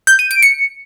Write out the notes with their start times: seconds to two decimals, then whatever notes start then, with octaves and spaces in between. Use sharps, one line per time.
0.07 G6
0.19 D#7
0.31 D7
0.42 C#7